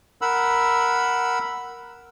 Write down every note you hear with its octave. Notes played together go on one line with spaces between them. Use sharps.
A#4 F#5 B5 E6